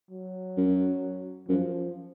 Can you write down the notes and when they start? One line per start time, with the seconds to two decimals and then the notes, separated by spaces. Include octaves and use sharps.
0.11 F#3
0.57 F#2
1.49 F#2 F3